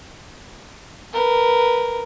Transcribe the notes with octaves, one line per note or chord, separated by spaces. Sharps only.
A#4 B4